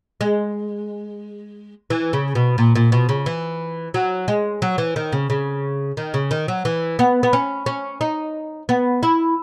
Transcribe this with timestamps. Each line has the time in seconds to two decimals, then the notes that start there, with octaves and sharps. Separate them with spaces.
0.21 G#3
1.90 E3
2.13 C#3
2.35 B2
2.58 A#2
2.75 A#2
2.92 B2
3.09 C#3
3.26 E3
3.94 F#3
4.28 G#3
4.62 F#3
4.78 E3
4.96 D#3
5.12 C#3
5.30 C#3
5.97 D#3
6.14 C#3
6.31 D#3
6.48 F#3
6.65 E3
6.99 B3
7.23 B3
7.33 C#4
7.66 C#4
8.01 D#4
8.69 B3
9.03 E4